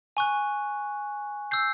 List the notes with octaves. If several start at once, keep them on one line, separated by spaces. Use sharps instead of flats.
G#5 C#6 F#6
E6 G6 C7